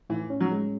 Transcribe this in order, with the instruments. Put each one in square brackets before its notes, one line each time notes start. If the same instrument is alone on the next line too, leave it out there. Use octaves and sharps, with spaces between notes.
[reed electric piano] A2 [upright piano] E3
[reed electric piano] C#4
[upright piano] F#3
[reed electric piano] G#3